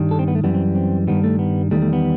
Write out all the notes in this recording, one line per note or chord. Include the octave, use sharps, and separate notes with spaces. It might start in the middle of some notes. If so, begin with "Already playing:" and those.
Already playing: G2 D#3 G3
A4
C4
B3
A3
F#2 E3 G3 B3
C4
C4
G2 D#3 G3 B3
A3
B3
E2 D#3 G3 A3
A3
B3